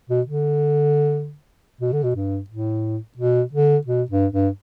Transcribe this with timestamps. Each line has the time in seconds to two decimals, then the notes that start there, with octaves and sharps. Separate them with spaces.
0.09 B2
0.26 D3
1.81 B2
1.93 D3
2.03 B2
2.16 G2
2.50 A2
3.18 B2
3.53 D3
3.86 B2
4.11 G2
4.33 G2